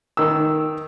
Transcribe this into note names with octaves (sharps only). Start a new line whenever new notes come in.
D#3 E6